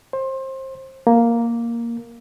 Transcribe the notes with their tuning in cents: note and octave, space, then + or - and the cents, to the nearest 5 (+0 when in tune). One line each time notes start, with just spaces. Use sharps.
C5 +25
A#3 +0